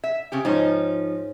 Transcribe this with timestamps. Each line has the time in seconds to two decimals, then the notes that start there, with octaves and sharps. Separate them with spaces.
0.04 E5
0.32 C#3 C4 G4
0.45 G#2 F3 C#4 D#4